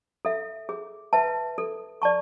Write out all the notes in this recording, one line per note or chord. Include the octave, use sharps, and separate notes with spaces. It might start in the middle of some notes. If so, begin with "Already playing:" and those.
A4 E5
G#4
B4 E5 A5
A4
D5 A5 C#6